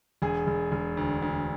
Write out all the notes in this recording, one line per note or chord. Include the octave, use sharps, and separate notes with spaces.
E1 G#4
E1
E1
D2
D2